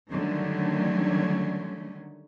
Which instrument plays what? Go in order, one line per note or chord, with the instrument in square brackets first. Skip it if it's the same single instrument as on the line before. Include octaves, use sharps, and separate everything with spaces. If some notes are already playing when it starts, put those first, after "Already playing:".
[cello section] D3 D#3 F#3 G3 A3 C#4